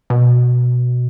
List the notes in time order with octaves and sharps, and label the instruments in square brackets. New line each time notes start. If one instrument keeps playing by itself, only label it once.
[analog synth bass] B2